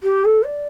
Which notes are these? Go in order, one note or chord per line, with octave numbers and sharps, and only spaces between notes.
G4
A4
D5